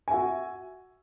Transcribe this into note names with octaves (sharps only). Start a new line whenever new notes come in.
F#4 E5 G#5